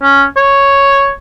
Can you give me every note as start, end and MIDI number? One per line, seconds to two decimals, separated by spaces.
0.02 0.24 61
0.37 1.10 73